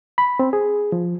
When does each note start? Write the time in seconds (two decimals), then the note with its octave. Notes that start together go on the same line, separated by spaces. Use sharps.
0.18 B5
0.39 C4
0.53 G#4
0.92 F3